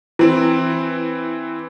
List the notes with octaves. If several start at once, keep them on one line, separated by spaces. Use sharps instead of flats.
E3 C4 E4